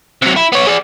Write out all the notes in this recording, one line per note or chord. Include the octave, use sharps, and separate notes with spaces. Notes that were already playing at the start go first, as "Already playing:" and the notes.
C3 F#3
E4
B3 C#5
G#4 D5